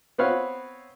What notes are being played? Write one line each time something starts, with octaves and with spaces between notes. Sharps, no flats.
B3 C4 B4 C#5 F5 F#5